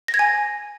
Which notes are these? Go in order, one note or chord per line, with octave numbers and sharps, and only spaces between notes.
A#6
G#6
G#5